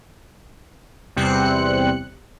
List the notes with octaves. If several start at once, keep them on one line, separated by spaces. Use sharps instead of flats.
E2 C3 G3 C4 F#6 C#7